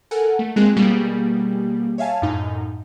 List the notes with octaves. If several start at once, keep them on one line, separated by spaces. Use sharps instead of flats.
A4 A#4 F#5 G#5
A3
G#3 A#3 C4 F4 G#4 F#6
B2 G3 A#3 G4 G#4
C#5 E5 F5 G#5 A5
F#2 A2 D#4